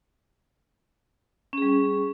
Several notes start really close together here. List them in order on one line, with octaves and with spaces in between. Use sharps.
C#4 G#4 G3